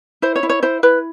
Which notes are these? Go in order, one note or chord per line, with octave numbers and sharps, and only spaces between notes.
E4 C5
C#5
E4
C#5
E4 C5
E4 B4